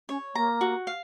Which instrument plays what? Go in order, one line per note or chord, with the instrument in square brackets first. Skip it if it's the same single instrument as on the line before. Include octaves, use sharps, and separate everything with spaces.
[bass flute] C#4 [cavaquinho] C#5
[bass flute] A#3 [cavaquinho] A#5
[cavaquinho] F#4
F5